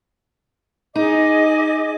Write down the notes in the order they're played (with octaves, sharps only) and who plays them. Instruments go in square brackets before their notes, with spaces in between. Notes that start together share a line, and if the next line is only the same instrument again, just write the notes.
[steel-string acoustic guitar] D#4 [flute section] G#4 D#5 D6